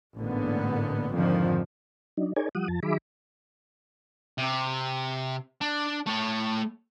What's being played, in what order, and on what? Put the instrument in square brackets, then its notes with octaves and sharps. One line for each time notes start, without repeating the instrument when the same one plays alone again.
[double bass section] A1 G#2 D3 A#3 B3
F2 G#2 D3 D#3 F3
[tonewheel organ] F#3 D4 D#4
D#4 G#4 A#4 C#5 D5 G#5
F3 G3 F#5 D#6
F2 F3 A5
D#3 F#3 G#4 E5 B5 D6
[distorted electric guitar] C3
D4
A3 C#5